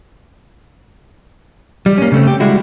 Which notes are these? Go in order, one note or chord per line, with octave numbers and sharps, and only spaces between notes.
G3
A#3 C#4
C#3 A3 C4
G4
G3 G#3 E4 F#4